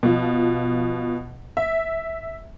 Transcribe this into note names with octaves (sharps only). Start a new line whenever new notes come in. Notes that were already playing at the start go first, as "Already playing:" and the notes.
B2 F3
E5